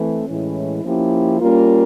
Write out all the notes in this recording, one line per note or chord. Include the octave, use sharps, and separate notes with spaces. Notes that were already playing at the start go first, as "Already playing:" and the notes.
Already playing: E3 A3 C4
A2 E3 G#3 C#4 E4
F3 A#3 C#4 E4 G4
G3 A#3 C#4 F4 A#4